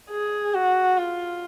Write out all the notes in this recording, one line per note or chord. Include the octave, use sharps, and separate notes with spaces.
G#4
F#4
F4